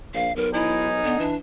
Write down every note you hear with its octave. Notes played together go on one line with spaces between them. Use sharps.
A#1 F5
B1 A#4
D#4 E4 G#5
D3 B3
E3 D4